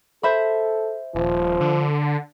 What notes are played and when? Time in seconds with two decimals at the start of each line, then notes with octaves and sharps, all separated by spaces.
0.23 A4 C5 E5 B5
1.15 D#1 F3
1.61 D3